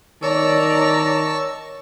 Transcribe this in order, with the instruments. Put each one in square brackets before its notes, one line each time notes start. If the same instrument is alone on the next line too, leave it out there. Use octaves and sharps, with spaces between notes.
[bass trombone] D#3 [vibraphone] C#5 [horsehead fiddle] D5 A#5 [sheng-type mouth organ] A5 C#6 E6